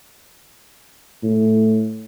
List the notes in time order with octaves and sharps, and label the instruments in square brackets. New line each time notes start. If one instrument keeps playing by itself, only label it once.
[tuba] A2